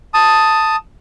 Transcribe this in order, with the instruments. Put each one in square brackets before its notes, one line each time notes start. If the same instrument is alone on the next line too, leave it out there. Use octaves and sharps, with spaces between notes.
[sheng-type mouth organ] A5 D#6